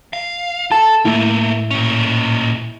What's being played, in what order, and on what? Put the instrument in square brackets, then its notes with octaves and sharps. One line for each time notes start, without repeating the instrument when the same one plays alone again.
[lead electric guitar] F5
[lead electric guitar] A4 [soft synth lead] A5
[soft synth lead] A2 [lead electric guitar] A3 A#3 [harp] E4
[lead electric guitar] A#2 C#4